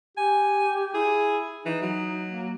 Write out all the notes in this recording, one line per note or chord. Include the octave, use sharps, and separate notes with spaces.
G4 G#5
E4 G#4
E3 D#4
F#3
A#3